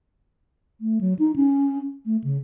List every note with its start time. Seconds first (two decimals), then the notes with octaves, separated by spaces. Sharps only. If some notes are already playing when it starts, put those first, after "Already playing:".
0.81 A3
1.01 F#3
1.19 D#4
1.36 C#4
2.06 A3
2.24 C#3